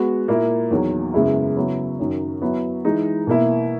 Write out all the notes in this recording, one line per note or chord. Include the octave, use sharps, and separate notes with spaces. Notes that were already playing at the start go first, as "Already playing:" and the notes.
Already playing: G#3 B3 F#4
A#2 A#3 E4
E2 D#3 F#3
F#2 C#3 G#3 B3 E4
C#3 F#3 B3 E4
F#2 D#3 F#3
F#3 B3 E4
E3 G#3 D#4
B2 A#3 E4